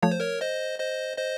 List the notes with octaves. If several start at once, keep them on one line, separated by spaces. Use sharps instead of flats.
F3 A3 C#5
C5
A#4 C#5
C5 D#5
C5 D#5
C5 D#5